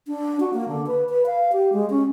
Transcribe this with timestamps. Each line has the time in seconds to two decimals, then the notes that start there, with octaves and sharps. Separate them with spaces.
0.08 D4
0.40 F#4
0.53 A#3
0.68 D3
0.87 B4
1.09 B4
1.26 F5
1.53 G4
1.73 G#3
1.90 C#4